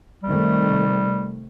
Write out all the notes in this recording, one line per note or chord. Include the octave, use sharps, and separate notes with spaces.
C3 D#3 G3 A3